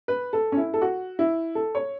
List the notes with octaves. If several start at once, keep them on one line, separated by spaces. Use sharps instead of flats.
B4
A4
C#4
E4
A4
F#4
E4
A4
C#5